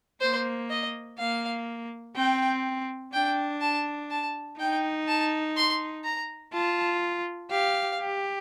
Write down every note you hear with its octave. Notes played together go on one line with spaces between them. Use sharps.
A#3 C5
D#5
A#3 F5
C4 G5
D4 G5
A5
A5
D#4 G5
A5
C6
A#5
F4 A5
G4 F5
G4